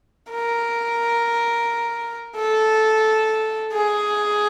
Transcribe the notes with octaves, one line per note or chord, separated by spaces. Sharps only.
A#4
A4
G#4